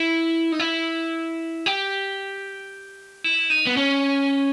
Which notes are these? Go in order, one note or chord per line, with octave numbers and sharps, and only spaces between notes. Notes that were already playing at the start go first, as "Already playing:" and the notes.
Already playing: E4
D#4
E4
G4
E4
D#4
B3
C#4